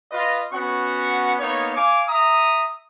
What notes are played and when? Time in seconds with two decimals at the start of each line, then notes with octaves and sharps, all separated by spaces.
0.12 F4 B4 D#5
0.53 B3 C#4 F#4 F#5 C#6
1.40 A#3 B3 D#4 C#5
1.76 F5 G#5 D6
2.09 E5 A#5 D#6